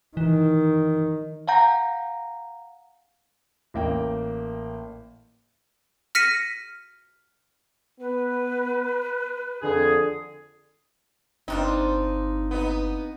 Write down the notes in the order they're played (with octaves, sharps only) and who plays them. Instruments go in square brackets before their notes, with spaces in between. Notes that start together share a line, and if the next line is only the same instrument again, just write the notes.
[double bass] D#3 [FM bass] E3
[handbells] F5 F#5 G#5 A#5 G6 A#6
[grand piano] A1 A#3 G5
[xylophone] F6 A#6 B6 C#7 D#7
[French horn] B3 [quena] B4
[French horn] F2 [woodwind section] D3 G#4
[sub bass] G1 [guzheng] C4 D4 F4 [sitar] D#4
[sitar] B3 D#4